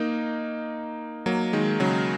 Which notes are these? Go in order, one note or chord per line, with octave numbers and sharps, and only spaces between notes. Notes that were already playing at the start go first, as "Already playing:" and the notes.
Already playing: A#3 D#4
F#3 A#3
D#3 G#3
C#3 F#3